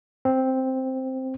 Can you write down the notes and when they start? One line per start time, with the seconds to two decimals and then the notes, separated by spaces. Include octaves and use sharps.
0.25 C4